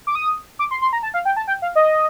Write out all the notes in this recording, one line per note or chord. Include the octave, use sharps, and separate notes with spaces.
D6
D#6
D6
C6
C6
A#5
A5
F5
G5
A5
G5
F5
D#5